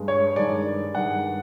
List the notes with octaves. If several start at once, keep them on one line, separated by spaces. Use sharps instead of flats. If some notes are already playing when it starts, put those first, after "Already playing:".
Already playing: G2 G#3
C#5
G2 D#3 G#3 D5
G2 D#3 G#3 F#5